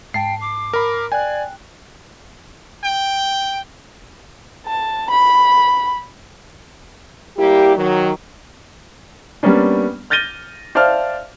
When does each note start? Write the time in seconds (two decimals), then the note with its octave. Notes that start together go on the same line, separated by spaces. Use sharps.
0.14 G#2 G5 A5 C7
0.41 D6
0.73 A#4 B5
1.12 D5 G5 G#5 F#6
2.84 G5
4.66 A5
5.10 B5
7.37 G3 A#3 E4 G4
7.77 D#3 F#3
9.43 G3 A#3 B3 C#4 D4
10.10 F6 G6 A6 A#6 D#7 G7
10.75 C5 D5 E5 F5 A5 F6